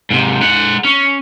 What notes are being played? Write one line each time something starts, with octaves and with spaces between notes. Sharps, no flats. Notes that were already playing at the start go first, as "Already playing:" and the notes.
G#2 C3
G#3 F#5
C#4